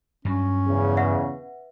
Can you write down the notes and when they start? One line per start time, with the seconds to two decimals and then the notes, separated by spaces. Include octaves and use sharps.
0.25 G2 F#3 C#4
0.67 E2 C#3
0.97 B4 E5 F#5